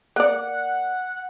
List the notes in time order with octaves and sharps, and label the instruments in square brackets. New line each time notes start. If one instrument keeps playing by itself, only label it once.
[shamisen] A#3 D5 [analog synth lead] F#5